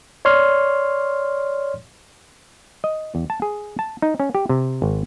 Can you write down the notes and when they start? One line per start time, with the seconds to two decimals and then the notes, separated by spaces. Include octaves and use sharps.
0.25 C#5 D5 C6 F6
2.84 D#5
3.15 E2
3.30 A5
3.42 G#4
3.79 A5
4.02 D#4
4.20 C#4
4.35 G4
4.49 C3
4.82 G#1